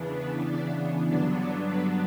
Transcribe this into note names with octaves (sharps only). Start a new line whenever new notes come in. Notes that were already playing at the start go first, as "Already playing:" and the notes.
Already playing: E2 C#3 E3 B3 D4
B4
D5
G2 D3 F#3 B3 D4 D5
D5
B4